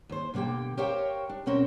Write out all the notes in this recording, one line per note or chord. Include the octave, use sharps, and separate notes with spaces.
D#2 C5
B2 D3 A#3 G4 G5
G4 A#4 C5 C#5 F5 G5
D4
D2 B2 C4 C#4 A#4 C5